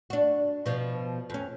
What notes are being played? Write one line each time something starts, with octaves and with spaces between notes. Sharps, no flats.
D4 F#4
B2 F3
F2 C#4